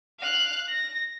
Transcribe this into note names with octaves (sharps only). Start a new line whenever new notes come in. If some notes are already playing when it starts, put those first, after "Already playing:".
F5 F#6
A#6